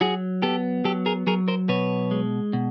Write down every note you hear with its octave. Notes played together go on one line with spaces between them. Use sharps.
F#3 F#4 G#4
B3 G4 A4
F#3 G4 A4
G#4 A#4
F#3 G#4 A#4
A#4 C5
B2 B4 C#5
G#3
B2